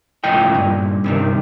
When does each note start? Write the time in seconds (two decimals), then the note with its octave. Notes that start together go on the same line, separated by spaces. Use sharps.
0.24 C#2 A2 F3 D#5 G5
0.54 G2 A#2
1.04 G2 C3 D#3